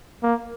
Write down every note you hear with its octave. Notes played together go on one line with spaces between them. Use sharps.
A#3